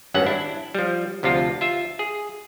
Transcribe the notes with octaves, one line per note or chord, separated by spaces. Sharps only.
G#1 G2 C#4 F#5
D4 E4
F3 G3
D2 C3 F3 F4 A5
F4 E5
G#4